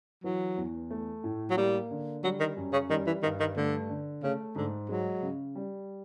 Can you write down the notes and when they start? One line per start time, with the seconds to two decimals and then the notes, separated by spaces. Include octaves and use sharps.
0.24 E3 F#3
0.57 E2
0.90 A3
1.24 A2
1.50 F#3
1.57 G3 A#3
1.91 D3
2.24 F#3 G3
2.40 D#3
2.57 F#2
2.73 C#3
2.89 D#3 G3
3.06 E3
3.23 G2 D#3
3.40 D#3
3.56 D3 A3
3.89 D3
4.23 C#3 A3
4.56 G#2 D3
4.89 F#3 G#3
5.22 C#3
5.55 G3